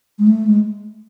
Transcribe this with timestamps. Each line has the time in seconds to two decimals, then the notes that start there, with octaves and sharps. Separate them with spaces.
0.19 G#3
0.27 A3
0.47 G#3